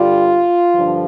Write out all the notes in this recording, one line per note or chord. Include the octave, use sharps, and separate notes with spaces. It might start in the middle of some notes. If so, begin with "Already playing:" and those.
Already playing: G2 D3 G3 F4
G2 D3 F3